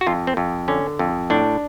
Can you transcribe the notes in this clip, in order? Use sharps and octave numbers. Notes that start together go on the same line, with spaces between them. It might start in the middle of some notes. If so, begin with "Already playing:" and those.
F#4
F2 F4
C4
F2
D3 C#4
F2
A2 D4